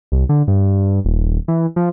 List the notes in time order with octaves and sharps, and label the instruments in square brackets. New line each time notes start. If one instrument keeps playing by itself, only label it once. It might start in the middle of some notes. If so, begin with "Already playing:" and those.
[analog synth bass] C2
D3
G2
D#1
E3
F3